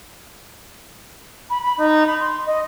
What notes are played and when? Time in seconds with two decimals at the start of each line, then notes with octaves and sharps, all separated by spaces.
1.50 B5
1.62 B5
1.78 D#4
2.06 B5
2.20 C6
2.46 D#5